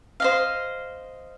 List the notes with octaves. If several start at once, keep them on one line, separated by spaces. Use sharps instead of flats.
C5 D#5 F5